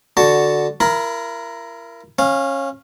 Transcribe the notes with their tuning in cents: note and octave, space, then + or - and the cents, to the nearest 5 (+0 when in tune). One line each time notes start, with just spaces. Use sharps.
D3 +0 F#4 +0 A5 +0
E4 +40 A#4 +0 B5 -5
C#4 -20 F5 +0